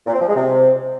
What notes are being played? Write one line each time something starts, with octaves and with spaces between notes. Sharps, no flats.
A#2
C4
F3
G#3
C3